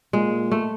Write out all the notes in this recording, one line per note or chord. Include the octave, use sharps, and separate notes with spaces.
A#2 G#3
A3